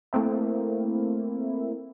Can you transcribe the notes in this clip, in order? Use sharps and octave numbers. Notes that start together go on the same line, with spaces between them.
A3 A#3 C4 E4